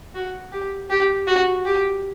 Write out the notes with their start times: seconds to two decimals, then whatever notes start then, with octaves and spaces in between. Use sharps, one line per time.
0.15 F#4
0.52 G4
0.90 G4
1.27 F#4
1.66 G4